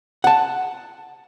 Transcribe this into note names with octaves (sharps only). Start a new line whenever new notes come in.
F#5 A5